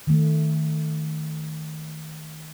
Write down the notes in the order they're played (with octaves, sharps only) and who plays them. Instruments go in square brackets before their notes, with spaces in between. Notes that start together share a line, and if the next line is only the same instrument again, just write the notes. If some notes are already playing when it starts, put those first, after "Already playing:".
[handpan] D#3 A3